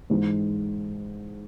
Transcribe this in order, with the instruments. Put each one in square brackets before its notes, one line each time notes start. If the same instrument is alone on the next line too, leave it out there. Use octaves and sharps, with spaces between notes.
[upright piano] G#2 E3 G#3